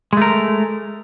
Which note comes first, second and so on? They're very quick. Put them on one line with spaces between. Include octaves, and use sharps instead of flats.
G#3 A3 A#4